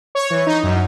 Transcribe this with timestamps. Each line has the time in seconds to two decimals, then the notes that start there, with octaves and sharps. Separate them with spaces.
0.15 C#5
0.30 E3
0.47 D#4
0.63 F#2